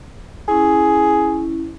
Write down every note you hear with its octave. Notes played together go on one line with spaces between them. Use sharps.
C#4 E4 G#4